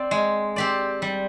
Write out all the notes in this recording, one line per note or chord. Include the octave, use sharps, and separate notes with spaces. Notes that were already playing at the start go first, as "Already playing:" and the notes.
Already playing: C4 D5
G#3
C4 G4 D5
G3